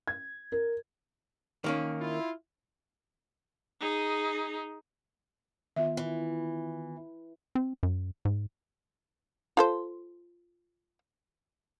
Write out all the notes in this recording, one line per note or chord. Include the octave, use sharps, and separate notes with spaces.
G#6
A#4
D#3 A#3 C#4
E4 F4
D#4 G#4
D#3 B3 F4 E5
E3
C4
F#2
G#2
F4 A4 C5